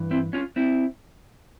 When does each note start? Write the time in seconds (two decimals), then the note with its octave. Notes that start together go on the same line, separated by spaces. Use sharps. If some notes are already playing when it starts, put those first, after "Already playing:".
Already playing: G2 E3
0.11 C4 E4
0.33 C#4 F4
0.56 C4 E4